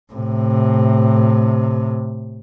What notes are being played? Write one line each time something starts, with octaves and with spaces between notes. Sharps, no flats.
A2 C3